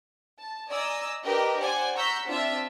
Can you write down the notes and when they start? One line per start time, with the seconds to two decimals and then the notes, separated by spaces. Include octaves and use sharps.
0.39 A5
0.70 D5 D#5 G#5 A#5 D#6 E6
1.23 D4 G4 A#4 B4 D#5
1.60 C5 D5 F#5 G#5
1.96 F#5 A#5 C#6 E6 G6 B6
2.25 C4 D4 F4 E5 A5